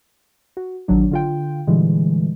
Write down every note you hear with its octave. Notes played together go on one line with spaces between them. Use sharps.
F#4
A1 D#3 F#3 D4
D3 F4 G5
A#2 D3 E3 G3 G#3